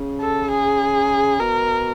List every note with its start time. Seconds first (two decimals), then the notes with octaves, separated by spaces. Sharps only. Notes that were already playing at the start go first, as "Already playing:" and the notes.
Already playing: C#3
0.21 A4
0.51 G#4
1.39 B2 A#4